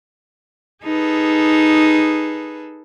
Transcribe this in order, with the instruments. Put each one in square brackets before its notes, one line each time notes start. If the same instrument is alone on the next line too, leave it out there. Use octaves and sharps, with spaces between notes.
[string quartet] D#4 G#4 A4 B4